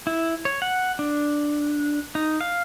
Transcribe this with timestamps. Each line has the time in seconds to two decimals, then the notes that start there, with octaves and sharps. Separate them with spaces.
0.07 E4
0.45 C#5
0.62 F#5
0.99 D4
2.15 D#4
2.41 F5